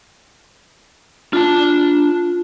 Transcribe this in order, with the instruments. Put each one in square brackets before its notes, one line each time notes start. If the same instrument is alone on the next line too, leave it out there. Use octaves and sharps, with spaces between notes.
[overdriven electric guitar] D4 A5 [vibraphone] F4